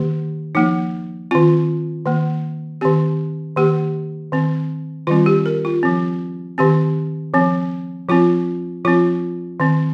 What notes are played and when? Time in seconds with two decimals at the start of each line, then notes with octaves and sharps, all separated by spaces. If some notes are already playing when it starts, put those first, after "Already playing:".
Already playing: D#3 A#3 G4
0.55 F3 A#3 D#4
1.31 D#3 C4 F4
2.06 D#3 A#3
2.81 D#3 C4 G4
3.56 D#3 A#3 G4
4.32 D#3 C4
5.07 D#3 G3 C4 F4
5.26 G4
5.46 A#4
5.65 F4
5.83 F3 C4
6.58 D#3 C4 G4
7.34 F3 C4
8.09 F3 C4 F4
8.85 F3 C4 F4
9.60 D#3 C4